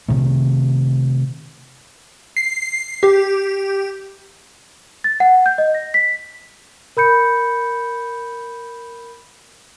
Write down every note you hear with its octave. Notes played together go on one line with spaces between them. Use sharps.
C3 D#3 A3
C7
G4
A6
F#5
G6
D#5
A#6
B6
A#4 B5 G6 C#7